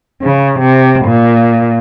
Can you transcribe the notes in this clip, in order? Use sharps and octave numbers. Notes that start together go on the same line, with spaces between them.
C#3
C3
A#2